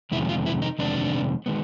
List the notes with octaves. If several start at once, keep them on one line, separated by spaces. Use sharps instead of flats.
F2 C3 D#3 G#3 B3 E4
F4
E4
D#4
F2 C3 D#3 G#3 B3 D4
D#3 G#3 B3